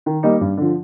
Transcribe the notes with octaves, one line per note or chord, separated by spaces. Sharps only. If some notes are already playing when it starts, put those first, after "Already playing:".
D#3
G3 A#3 D#4
G2
D3 F3